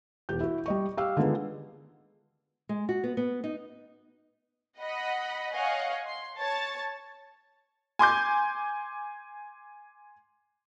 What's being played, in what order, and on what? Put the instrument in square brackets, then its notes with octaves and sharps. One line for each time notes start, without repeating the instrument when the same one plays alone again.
[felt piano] E1 G4 G6
E4 F#4
G3 D#5 C#6
G4 F5 E6
D3 D#3 G#3 B3 F4 G#4
[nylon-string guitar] G#3
F#4
B3
B3
D#4
[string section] D#5 F#5 B5
C#5 D#5 F5 F#5 G#5
C6
C#5 A5 A6
[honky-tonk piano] G#5 C6 D6 G6